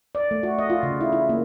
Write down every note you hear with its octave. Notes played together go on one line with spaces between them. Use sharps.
D5
A3
F#4
D#5
F4
C#3
E4
E4
A#3